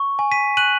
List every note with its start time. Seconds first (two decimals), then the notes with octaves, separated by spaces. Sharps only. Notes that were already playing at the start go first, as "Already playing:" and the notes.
Already playing: C#6
0.19 G#5
0.32 B6 D#7
0.57 F#6 D#7 F#7